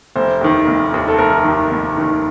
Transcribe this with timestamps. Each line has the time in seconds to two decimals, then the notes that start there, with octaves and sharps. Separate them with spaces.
0.16 F1 C5
0.41 D#2 D#3
0.68 F1
0.93 D#2 D#3
1.09 A4
1.19 F1 A#4
1.44 D#2 D#3
1.71 F1
1.97 D#2 D#3